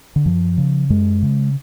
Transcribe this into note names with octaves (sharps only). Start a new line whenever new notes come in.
D3
F#2 F3
C#3
F#2 G#3
C#3